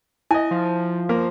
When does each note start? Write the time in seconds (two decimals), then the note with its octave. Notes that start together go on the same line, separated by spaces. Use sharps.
0.31 E4 D#5 G#5
0.51 F3
1.09 A#3